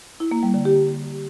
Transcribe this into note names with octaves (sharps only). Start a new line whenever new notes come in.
E4
A#3
G3
D3
G4